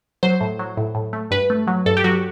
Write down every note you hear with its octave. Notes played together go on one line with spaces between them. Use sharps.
F#3 C5
A2
F#3
A2
A2
A3
G2 B4
A3
F#3
G2 A4
G4
F#3 F#4